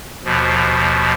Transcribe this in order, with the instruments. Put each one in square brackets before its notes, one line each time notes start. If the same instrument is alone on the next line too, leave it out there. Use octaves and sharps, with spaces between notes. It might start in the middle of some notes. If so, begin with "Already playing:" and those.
[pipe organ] D#2 B2 F3